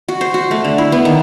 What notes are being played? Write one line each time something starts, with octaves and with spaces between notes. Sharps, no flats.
F#4
C5
F#4
A3
D3
E4
B3
D#3